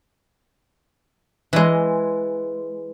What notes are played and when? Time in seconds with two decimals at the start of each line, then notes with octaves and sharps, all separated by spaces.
1.53 E3 G#3